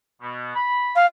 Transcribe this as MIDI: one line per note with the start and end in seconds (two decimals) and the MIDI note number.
0.21 0.53 47
0.55 0.94 83
0.96 1.06 77